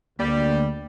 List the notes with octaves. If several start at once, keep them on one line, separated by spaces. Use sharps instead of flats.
D2 G3 A#3